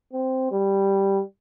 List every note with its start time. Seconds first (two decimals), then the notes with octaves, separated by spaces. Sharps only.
0.13 C4
0.52 G3